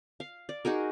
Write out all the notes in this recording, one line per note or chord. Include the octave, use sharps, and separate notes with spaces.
F5
D5
D#4 F#4 G#4 A#4